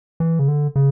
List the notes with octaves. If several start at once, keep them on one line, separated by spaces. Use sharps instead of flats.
E3
C#3
D3
C#3